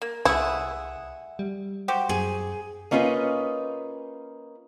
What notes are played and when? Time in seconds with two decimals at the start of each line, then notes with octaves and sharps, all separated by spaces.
0.02 A#3
0.25 C2 A3 E4 G#4 E5 F#5
1.39 G3
1.88 F#4 G4 C5
2.09 F#2 G#4
2.91 A#3 C#4 D#4 F4 B4